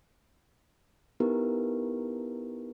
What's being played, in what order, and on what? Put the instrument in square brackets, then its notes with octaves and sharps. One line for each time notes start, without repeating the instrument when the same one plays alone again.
[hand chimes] B3 D#4 E4 G4 A#4 B4